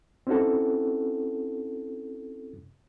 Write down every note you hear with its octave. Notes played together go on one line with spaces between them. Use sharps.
C4 C#4 D#4 E4 F#4 A4